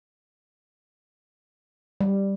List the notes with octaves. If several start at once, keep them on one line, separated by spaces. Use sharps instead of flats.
G3